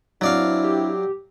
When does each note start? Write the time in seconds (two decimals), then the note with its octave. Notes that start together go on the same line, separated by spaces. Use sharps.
0.21 F#3 C4 D4 E4 D5 F5
0.64 G4